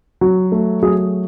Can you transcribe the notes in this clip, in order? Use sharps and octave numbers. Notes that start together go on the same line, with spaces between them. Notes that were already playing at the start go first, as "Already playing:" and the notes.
F#3
A3
F#3 G#4